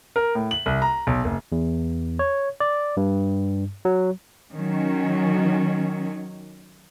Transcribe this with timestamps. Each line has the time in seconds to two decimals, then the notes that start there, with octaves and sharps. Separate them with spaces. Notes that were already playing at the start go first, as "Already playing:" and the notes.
0.16 A#4
0.35 A2
0.51 F#7
0.66 C2
0.82 A#5
1.07 B1
1.24 F#1
1.52 E2
2.19 C#5
2.60 D5
2.97 G2
3.85 F#3
4.53 D#3 F#3 C#4